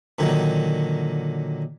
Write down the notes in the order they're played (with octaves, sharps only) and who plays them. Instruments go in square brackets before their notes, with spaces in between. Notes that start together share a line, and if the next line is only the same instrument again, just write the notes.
[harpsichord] A#2 D3 D#3 F#3